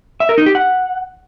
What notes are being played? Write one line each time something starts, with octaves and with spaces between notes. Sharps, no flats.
E5
A#4
D#4
G4
F#5